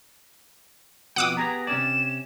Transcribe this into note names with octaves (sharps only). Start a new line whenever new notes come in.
F2 B2 F#5 D6 D#6
B3 G4 G#4 A#5
C3 C#4 D5 E7